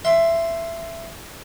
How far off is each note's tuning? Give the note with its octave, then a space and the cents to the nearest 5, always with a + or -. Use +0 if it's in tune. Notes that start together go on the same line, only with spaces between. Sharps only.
E5 +15 C6 +0